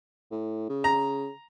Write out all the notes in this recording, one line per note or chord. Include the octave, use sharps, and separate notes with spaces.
A2
C#3
A#5